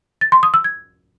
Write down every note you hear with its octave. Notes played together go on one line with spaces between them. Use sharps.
A6
C6
D#6
E6
G#6